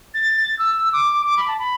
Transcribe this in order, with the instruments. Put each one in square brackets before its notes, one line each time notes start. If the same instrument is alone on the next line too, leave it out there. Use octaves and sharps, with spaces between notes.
[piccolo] A6
A6
E6
D6
D6
B5
A5
B5